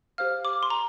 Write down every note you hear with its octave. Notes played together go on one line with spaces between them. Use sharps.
G4 C5 F5 F6
D6
C6
A#5